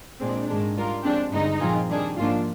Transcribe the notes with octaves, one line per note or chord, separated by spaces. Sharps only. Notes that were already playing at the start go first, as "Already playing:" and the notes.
A#2 G#3 C4 D4
G#2 D#3 G#3 D4
G3 D4 F4 A#4
F3 G#3 C4 D4 G4
G2 D3 G#3 D#4
A#2 F3 C4 F4 G#4
D#3 G3 D4 G#4
G#2 F3 A#3 D4 F4